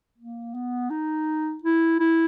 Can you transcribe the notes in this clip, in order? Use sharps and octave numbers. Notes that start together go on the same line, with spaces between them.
A#3
B3
D#4
E4
E4